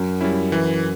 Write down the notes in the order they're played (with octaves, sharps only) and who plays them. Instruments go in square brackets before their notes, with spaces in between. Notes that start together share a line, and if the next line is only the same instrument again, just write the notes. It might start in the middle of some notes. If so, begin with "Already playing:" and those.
Already playing: [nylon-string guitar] F#2
[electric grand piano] G3 C#4 E4
E3